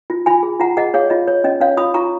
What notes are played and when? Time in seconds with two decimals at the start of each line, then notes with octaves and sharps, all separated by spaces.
0.10 F4
0.26 F4 G#5 B5
0.43 G#4
0.60 F4 F#5 A#5
0.77 G#4 D#5 F#5
0.94 G#4 C#5 F5
1.10 F4 D#5
1.27 C#5
1.44 C#4 D#5
1.60 C#4 C#5 F5
1.77 F4 B5 D#6
1.94 F4 A#5 C#6